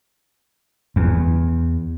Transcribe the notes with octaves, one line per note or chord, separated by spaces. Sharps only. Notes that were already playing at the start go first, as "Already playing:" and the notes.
E2